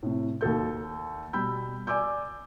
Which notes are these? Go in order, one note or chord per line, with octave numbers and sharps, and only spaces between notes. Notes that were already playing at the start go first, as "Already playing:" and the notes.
A2 C3
D#2 F#4 A4 G6
B2 G3 B5 E6 G6
D5 G#5 D6 E6 G6